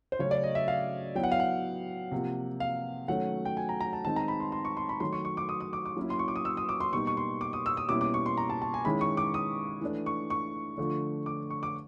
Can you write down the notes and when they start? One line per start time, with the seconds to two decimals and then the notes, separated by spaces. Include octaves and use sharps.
0.12 C5
0.19 C#3 F#3 A3 C#4 C#5
0.31 D5
0.44 D#5
0.55 E5
0.68 F5
1.15 F#3 B3 E4 G5
1.24 F#5
1.32 F5
1.40 F#5
2.12 C3 F3 A#3
2.60 F5
3.08 D#3 F#3 A3 C#4 F#5
3.45 G5
3.57 G#5
3.69 A#5
3.81 A#5
3.93 A5
4.05 D#3 G#3 C4 D#4 A5
4.16 A#5
4.28 B5
4.40 C6
4.52 C6
4.65 C#6
4.77 C6
4.89 B5
5.00 D#3 F#3 A3 C6
5.13 C#6
5.25 C#6
5.37 D6
5.49 D#6
5.60 D#6
5.73 D6
5.85 D6
5.97 F#3 A#3 C#4 E4
6.10 C6
6.19 C#6
6.28 D6
6.36 D#6
6.45 E6
6.57 D#6
6.69 D6
6.80 C6
6.93 B2 G3 A#3 D#4 C#6
7.07 C#6
7.17 C6
7.41 D6
7.53 D#6
7.66 E6
7.77 D#6
7.89 B2 G3 A#3 C#4 E4 D6
8.01 D6
8.14 C#6
8.26 C6
8.37 A#5
8.50 A5
8.62 A5
8.74 G#5
8.85 D#3 G#3 C#4 E4 B5
9.01 C#6
9.17 D6
9.34 D#6
9.81 E3 A3 D4
10.06 C#6
10.30 C#6
10.77 D3 F3 A3 D4
11.26 D6
11.50 C#6
11.63 D6